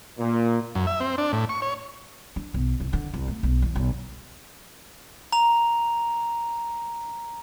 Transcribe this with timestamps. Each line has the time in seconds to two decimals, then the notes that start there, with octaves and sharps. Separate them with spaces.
0.18 A#2
0.75 F#2
0.87 E5
1.00 C4
1.18 D4
1.33 A2
1.49 C#6
1.62 C#5
2.36 D4
2.54 B1
2.80 C2
2.93 D3
3.14 C2
3.28 A3
3.43 B1
3.62 E2
3.75 B1
5.32 A#5 F7